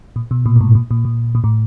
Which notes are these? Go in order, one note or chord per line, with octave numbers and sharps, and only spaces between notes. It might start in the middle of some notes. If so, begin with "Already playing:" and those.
A#2
B2
A#2
A2
G#2
A#2
A#2
A#2
A#2
A2